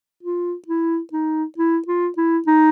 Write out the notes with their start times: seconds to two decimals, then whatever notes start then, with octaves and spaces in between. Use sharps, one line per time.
0.23 F4
0.68 E4
1.13 D#4
1.58 E4
1.88 F4
2.17 E4
2.47 D#4